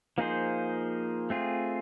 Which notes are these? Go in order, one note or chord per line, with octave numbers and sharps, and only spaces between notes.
F3 A#3 D#4 G#4 C5
A3 C4 F4 G#4